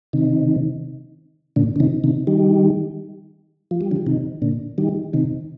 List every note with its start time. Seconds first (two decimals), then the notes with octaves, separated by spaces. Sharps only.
0.13 C3 D#3
1.56 A#2 D3
1.76 D3
1.80 C3 D#3
2.04 C3 D#3
2.27 D#3 G3
3.71 F3
3.81 G3
3.91 D3 F3
4.06 C3 D#3
4.42 A#2 D3
4.78 D#3 G3
5.13 C3 D#3